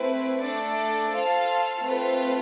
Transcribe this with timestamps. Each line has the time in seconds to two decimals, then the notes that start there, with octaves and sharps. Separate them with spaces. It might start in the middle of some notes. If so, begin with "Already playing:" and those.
Already playing: A3 C4 E4 B4
0.43 A3 D4 A4 D5
1.14 F4 A4 C5 F5 A5
1.84 A3 C4 F4 B4